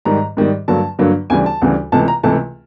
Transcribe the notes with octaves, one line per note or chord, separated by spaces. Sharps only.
G#2 D#3 G3 A#5
G#2 D#3 G3
G2 D3 F#3 A#3 A5
G2 D3 F#3 A#3
D2 C#3 E3 G3 G#5
A5
D2 C#3 E3 G3
C#2 C3 E3 A3 A5
A#5
C#2 C3 E3 A3 A5